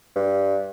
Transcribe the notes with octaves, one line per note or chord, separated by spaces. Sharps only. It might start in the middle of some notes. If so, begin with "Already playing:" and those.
G2